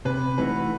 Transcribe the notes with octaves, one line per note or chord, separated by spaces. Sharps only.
C3 B4
E3 A3 D#4 F#4 B4